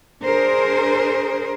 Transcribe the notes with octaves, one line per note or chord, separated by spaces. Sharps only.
D4 G#4 A#4 C5